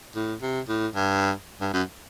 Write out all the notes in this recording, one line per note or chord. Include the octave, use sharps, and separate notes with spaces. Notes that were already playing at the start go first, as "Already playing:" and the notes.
A2
C3
A2
G2
G2
F#2